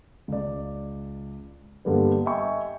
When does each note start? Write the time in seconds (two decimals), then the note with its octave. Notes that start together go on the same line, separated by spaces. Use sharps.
0.28 C#2 D5
1.85 G2 D3 G3 A#3 B3
2.25 D#5 E5 G5 G#5 C#6